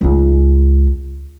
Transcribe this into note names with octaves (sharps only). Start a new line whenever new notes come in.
C#2 D#4